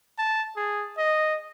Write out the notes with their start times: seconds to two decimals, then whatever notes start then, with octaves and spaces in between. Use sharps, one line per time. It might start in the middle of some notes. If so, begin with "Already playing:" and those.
0.19 A5
0.57 G#4
0.98 D#5